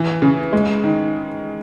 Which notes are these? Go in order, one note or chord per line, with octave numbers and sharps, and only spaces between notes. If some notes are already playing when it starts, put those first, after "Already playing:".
Already playing: E3
C#3
G#3
D#3